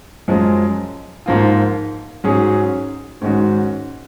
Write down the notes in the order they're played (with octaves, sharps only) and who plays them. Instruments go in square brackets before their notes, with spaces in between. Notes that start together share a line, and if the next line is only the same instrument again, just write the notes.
[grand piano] F#2 F3 G#3
G#2 F3 A#3 F4
G#2 F#3 C#4 G#4
G#2 D#3 G#3 C#4 F#4